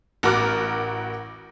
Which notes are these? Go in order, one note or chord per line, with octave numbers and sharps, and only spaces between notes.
A1 F#4 A#4 D6 F6 F#6